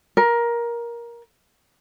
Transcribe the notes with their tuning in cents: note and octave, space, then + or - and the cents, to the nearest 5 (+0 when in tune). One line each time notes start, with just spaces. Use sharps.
A#4 +15